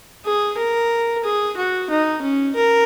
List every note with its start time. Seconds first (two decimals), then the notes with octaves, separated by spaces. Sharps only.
0.25 G#4
0.57 A#4
1.24 G#4
1.57 F#4
1.90 D#4
2.22 C#4
2.55 A#4